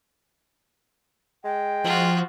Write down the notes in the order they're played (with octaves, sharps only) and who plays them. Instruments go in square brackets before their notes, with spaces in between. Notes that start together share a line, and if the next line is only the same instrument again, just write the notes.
[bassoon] G#3 [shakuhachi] G5
[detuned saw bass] F3 [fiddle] F4 F#4